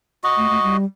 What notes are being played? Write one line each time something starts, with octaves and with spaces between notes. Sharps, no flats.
F#4 D#5
A3
A3
G3